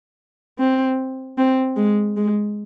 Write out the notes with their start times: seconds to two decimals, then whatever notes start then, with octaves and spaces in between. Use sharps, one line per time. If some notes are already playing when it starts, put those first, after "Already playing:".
0.59 C4
1.38 C4
1.77 G#3
2.17 G#3